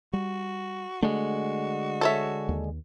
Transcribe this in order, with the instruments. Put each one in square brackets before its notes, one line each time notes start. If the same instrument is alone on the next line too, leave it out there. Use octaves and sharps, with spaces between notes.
[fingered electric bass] G3 [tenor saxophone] F#4
[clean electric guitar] D3 G#3 [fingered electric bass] A3 [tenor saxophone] F#4
[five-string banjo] A4 C#5 E5
[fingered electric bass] D#2